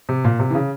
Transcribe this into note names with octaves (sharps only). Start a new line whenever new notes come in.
C3
A#2
C3
E3
C#3